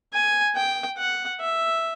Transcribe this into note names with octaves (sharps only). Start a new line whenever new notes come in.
G#5
G5
F#5
E5